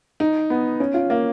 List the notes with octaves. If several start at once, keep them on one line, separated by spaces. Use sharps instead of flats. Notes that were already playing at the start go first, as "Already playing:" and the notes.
D#4
B3
C#4
F4
A#3